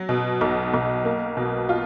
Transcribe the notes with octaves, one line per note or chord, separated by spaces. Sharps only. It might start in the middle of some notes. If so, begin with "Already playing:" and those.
Already playing: F#3
B2
B1
B1
A#3
B2
F4